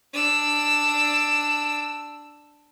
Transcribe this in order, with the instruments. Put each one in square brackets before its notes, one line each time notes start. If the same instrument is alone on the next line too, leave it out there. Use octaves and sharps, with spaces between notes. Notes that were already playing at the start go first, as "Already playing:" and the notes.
[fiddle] D4 E6